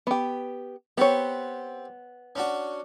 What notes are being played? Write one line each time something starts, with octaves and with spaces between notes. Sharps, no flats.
B3 G4
B3 C4 G4 C#5
C#4 D4 F#4